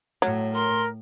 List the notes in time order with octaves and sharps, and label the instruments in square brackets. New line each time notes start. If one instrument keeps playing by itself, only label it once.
[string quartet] A2 [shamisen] F#3
[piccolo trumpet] A#4 [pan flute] C6